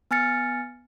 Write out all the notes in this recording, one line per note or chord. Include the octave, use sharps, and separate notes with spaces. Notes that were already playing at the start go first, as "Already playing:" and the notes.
B3 G#5 F6 A6 C#7